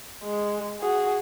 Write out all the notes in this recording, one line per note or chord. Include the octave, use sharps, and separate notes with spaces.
G#3
F#4 G#4